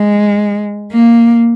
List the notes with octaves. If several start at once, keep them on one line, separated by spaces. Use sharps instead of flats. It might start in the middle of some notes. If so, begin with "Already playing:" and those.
Already playing: G#3
A#3